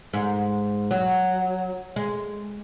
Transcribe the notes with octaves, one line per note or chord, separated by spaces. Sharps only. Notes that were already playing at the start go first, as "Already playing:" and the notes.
G#2
F#3
G#3